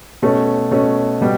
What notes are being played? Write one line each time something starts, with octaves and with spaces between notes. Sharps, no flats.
B2 A3 C#4
B2 A3 C#4
B2 G3